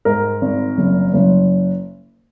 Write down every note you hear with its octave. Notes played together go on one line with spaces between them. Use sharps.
G#2 A#4
G#1
F#1
F#1